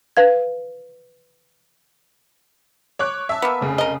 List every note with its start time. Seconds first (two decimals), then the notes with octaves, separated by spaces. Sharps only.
0.17 B4 F5 G#6
2.99 C#5 D6 F#6
3.29 E5 A5
3.42 A#3 B3
3.61 F1 C#3
3.78 A#4 D#5